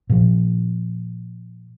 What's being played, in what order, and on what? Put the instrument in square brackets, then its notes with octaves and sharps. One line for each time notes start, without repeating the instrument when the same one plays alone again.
[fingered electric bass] A#2 F3